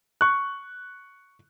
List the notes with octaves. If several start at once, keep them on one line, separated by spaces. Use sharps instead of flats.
C#6 F#6